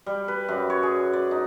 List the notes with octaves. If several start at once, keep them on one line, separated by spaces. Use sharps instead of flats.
G3
B4
F#2
C#5
G#4
D5
D#4